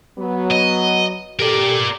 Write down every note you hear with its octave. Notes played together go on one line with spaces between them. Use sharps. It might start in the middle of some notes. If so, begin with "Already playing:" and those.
F#3 B3
D#5
G4 A4 A#4 D5